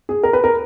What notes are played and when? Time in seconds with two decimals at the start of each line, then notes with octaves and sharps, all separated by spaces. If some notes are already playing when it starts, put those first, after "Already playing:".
0.09 G#4
0.23 A#4
0.33 B4
0.44 A#4